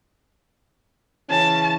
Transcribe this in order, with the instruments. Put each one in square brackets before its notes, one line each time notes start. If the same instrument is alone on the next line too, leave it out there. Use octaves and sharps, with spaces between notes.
[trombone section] C#3 E3 C#4 [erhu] A5